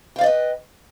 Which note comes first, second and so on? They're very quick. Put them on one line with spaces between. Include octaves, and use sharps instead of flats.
G5 F5 D5 D#5 B4